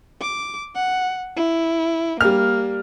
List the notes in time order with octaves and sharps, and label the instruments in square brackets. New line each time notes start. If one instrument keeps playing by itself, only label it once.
[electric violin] D6
F#5
E4
[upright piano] G3 F6 [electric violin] A#3